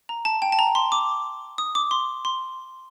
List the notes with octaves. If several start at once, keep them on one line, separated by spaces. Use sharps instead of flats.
A#5
A5
G5
A5
A#5
C6
D6
D#6
D6
C6
C6